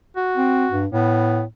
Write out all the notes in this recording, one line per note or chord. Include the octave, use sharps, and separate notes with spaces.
F#4
C4
G2
A2 B3